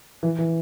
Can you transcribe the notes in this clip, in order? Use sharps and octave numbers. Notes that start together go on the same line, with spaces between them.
E3
E3